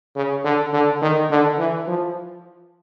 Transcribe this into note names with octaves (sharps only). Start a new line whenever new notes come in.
C#3
D3
D3
D#3
D3
E3
F3